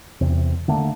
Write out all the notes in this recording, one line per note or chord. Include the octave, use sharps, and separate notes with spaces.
E2 C3
D3 A3 A#3 D4